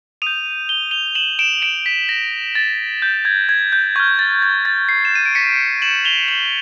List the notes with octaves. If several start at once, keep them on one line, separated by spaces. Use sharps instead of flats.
D#6 G6 D#7 F7
G7
F7 G7
E7 F#7
D7 E7
D7 E7
B6
A#6
A6
G6
G#6
G#6
G6
C#6 F6 G#6
A6
G#6
A6
C7
E7
D#7
D7
B6 C#7
E7 F#7
F7 G7
E7 F#7